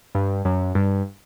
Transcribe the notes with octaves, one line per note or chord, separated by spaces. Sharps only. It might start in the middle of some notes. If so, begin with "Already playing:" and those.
G2
F#2
G2